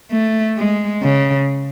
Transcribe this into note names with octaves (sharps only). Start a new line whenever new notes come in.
A3
G#3
C#3